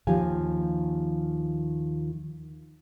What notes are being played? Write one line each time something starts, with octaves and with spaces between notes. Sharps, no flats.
D#2 D#3 F3 G4 F5 G#5